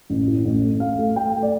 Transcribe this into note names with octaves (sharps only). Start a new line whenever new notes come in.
A1
A2
A1
A3
A3 F5
A3
A3 G5
A3
D5